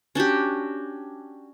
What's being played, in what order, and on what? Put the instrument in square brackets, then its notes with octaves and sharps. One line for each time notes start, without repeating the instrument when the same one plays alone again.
[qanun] C#4 D4 F#4 G4